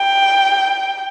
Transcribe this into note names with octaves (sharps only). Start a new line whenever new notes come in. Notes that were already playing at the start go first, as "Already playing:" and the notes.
Already playing: G5